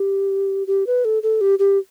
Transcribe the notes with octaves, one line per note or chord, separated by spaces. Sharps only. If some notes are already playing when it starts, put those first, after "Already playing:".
Already playing: G4
G4
B4
A4
A4
G4
G4